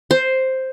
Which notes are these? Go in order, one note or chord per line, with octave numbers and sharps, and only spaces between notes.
C5